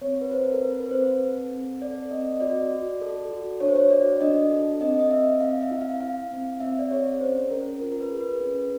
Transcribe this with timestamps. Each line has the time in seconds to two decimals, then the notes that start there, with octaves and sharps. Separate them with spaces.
0.01 C4 C#5
0.21 B4
0.31 A4 C5
0.52 A#4
0.61 C4 B4
0.86 B4
0.91 C4 C5
1.20 A4
1.51 C4
1.82 A4 D5
2.11 C4 D#5
2.36 D#5
2.40 F#4 D5
2.71 F#4
3.02 A4
3.31 F#4
3.60 D4 C#5
3.68 C5
3.76 C#5
3.91 F#4 D5
4.21 D4 D#5
4.51 A4
4.81 C4 D#5
4.99 D#5
5.11 C4 E5
5.41 C4 F5
5.61 E5
5.71 E4
5.81 F5
6.01 E4 F5
6.31 C4
6.60 C4 E5
6.79 D5
6.91 G#4 C#5
7.20 C#4 C5
7.51 C#4 A#4
7.81 F4 A#4
7.92 A#4
8.01 B4
8.10 G#4
8.21 B4
8.40 C#4